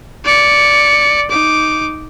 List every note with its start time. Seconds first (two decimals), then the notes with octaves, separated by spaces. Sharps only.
0.25 D5 C#7
1.30 D#4 D6